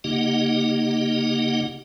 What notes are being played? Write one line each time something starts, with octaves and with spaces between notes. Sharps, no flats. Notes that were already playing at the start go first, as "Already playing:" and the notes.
C#3 A#3 D#4 G4 D#5 F#5